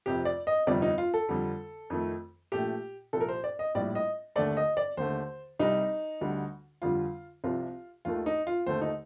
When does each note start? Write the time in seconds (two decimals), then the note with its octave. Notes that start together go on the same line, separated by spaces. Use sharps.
0.06 F1 F2 C3 G4
0.25 D5
0.47 D#5
0.67 G1 F2 C3 G3 D5
0.82 D#4
0.98 F4
1.14 A4
1.29 F2 D3 G3
1.90 F2 D#3 A3
2.52 A#1 A#2 A3 G4
3.13 C2 A#2 F3 A4
3.21 A#4
3.28 C5
3.44 D5
3.59 D#5
3.75 A#1 A2 G3 D5
3.95 D#5
4.36 D#2 D3 A3 D5
4.57 D#5
4.77 D5
4.97 D#2 D3 A3 C5
5.59 C2 C3 G3 D#4
6.21 D2 D3 G3
6.82 F2 D3 G3 F4
7.44 C2 C3 F3 F4
8.05 D#2 D#3 A3 F4
8.26 D#4
8.47 F4
8.66 D#2 D3 A3 C5
8.81 D#4